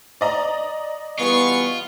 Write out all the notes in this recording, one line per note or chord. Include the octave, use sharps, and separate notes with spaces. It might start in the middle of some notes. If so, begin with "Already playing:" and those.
D5 D#5 A#5
E3 G3 B3 F4 G#4 C#6